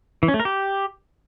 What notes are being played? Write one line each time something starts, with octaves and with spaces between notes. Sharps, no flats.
E3
C#4
A3
A#4
G4